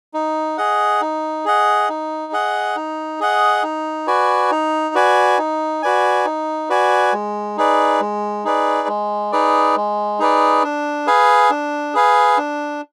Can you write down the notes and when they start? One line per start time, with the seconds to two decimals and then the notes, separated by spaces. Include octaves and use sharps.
0.14 D#4
0.58 G#4 D#5 F#5
1.01 D#4
1.45 G#4 D#5 F#5
1.89 D#4
2.32 G#4 D#5 F#5
2.76 D#4
3.20 G#4 D#5 F#5
3.63 D#4
4.07 F#4 B4 D5 G#5
4.51 D#4
4.95 F#4 B4 D5 G#5
5.38 D#4
5.82 F#4 B4 D5 G#5
6.25 D#4
6.70 F#4 B4 D5 G#5
7.13 G#3
7.57 D#4 G#4 B4 D5
8.00 G#3
8.44 D#4 G#4 B4 D5
8.88 G#3
9.32 D#4 G#4 B4 D5
9.76 G#3
10.19 D#4 G#4 B4 D5
10.63 D4
11.07 G#4 B4 F5 G#5
11.50 D4
11.94 G#4 B4 F5 G#5
12.38 D4